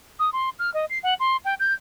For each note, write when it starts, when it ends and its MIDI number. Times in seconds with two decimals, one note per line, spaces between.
0.19 0.30 87
0.33 0.50 84
0.59 0.73 89
0.74 0.85 75
0.90 0.99 96
1.03 1.14 78
1.20 1.37 84
1.45 1.54 79
1.60 1.74 91